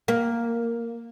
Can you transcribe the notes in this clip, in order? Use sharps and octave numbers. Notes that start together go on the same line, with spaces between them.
A#3